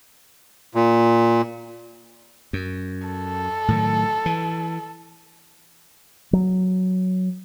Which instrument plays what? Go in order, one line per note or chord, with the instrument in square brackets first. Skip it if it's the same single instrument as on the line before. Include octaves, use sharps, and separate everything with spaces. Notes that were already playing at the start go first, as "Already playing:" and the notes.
[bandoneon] A#2
[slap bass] F#2
[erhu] A4
[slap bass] A2 D#3 F#3
E3
[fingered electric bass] F#3